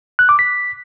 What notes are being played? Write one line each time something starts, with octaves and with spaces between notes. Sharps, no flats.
F#6
D6
B6